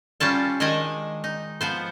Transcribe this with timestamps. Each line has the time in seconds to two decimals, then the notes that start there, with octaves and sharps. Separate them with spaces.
0.20 G3 C#4 F4 A5
0.60 D#3 G#3 D4 D#5 G#5
1.24 D#4
1.61 F3 B3 C5